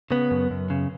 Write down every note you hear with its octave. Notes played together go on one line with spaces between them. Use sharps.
C#3 B3
F#2
F#2
C#3